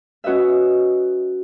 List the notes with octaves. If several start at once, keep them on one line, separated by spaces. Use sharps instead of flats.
C#4 F#4 B4 D#5 E5